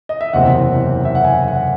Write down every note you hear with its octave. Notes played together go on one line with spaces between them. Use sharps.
D#5
E5
F#1 E2 C3 E3 C4 F#5
E5
F#5
G#5
F#5